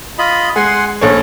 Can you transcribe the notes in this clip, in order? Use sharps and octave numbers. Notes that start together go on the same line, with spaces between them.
F4 D#5 B5
G#3 F#5 G#5 C6
A#1 C#4 A4 C#5